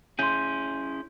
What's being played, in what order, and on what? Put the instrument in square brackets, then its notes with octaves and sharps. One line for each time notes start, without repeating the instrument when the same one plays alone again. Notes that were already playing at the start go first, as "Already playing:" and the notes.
[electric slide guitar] C#4 E4 G#4 [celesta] C6 G6